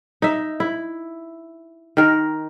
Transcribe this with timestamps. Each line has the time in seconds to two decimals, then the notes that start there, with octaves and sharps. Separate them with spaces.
0.22 D#4 E5
0.60 E4
1.97 D#3 A#4